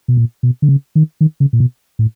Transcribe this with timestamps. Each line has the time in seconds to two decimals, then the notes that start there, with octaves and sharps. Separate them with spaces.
0.08 B2
0.17 A#2
0.43 B2
0.62 D3
0.69 C#3
0.95 D#3
1.21 D#3
1.40 C#3
1.53 A#2
1.60 B2
1.99 A2